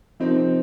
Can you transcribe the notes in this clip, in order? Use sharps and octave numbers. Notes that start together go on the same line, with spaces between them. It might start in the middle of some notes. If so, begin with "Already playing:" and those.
C3 F3 A#3 C4 D#4
C4